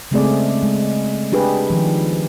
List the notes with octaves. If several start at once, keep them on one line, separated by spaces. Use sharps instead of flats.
C#3 G#3 A3 C4 G#4 D5
G#3
D4 G4 G#4 B4
D#3 F3